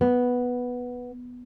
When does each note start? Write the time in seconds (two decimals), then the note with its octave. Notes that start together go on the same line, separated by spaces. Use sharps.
0.01 B3